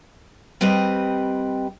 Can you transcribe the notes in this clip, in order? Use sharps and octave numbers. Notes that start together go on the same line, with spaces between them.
G3 C4 G4 B4 D#5